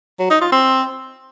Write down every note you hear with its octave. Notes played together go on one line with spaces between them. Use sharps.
F#3
D#4
F4
C4